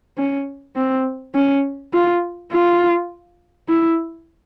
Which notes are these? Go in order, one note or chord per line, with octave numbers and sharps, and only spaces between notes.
C#4
C4
C#4
F4
F4
E4